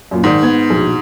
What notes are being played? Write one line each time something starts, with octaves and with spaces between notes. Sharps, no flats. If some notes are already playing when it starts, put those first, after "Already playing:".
F#2 A#2
G#2 D#3 D5
B3 G#6
A#1 B2